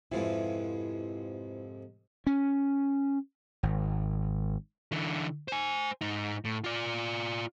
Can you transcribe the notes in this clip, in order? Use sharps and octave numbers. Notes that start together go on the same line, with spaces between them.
F2 G#2 C3 E4 F4 B4
C#4
G#1
D3 E3
C5 G#5
G#2 D#4
A2
F4 D5